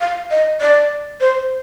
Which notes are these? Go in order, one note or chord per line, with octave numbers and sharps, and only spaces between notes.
F5
D#5
D5
C5